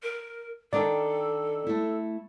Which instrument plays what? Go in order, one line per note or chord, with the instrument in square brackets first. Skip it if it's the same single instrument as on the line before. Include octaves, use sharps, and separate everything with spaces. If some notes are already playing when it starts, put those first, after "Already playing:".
[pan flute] A#4
[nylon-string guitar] D#3 D4 G5 [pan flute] A4 [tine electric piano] D5
[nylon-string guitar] A3 E4